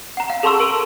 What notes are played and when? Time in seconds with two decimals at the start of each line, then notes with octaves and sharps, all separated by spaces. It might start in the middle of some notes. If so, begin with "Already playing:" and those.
0.17 F#5 A#5
0.30 F5
0.43 G#4 A4 A5 C6 C#6 E6
0.60 A#4 D7 D#7 G7